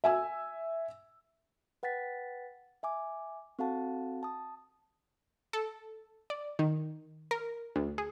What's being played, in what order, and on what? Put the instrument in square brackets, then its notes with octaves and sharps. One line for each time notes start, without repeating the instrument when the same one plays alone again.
[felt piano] E5 G#5 E6
[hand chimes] B4 F#5 G5 A6 B6
E5 G#5 D6
C4 F#4 A4 F5 F#5 A5
A5 D#6
[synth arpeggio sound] A4
D5
D#3
A#4
D2
G#4